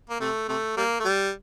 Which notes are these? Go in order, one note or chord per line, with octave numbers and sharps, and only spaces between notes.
A#3
C3 A3
C3 A3
G3 A#3
A3
G3